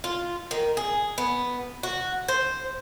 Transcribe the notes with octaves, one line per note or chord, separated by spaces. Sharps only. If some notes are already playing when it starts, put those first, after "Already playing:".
F4
D#3
G#4
B3
F#4
C5